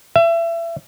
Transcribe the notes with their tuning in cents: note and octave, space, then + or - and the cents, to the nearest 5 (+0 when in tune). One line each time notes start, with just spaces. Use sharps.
E5 +30